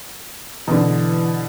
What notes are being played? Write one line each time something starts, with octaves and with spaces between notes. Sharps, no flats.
B2 D3 E3